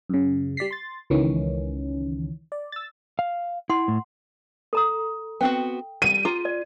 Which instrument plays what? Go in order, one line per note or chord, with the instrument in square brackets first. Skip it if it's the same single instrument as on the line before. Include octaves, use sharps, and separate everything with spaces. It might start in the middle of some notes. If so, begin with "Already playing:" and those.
[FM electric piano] F#2 C#3
G3 D5 B6 C7
C6 A6
C#2 D#3 E3 C#4
D5
E6 A6
[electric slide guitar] F5
[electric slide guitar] E4 [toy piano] F#5 C6
[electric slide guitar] A2
[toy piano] A4 A#5 D#6
[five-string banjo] B3 C4 F#4 [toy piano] G5
[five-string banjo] G3 [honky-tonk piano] D#7
[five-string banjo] F4 A#5 [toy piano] G#4
[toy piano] D5